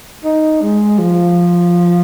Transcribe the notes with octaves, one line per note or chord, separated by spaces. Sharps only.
D#4
G#3
F3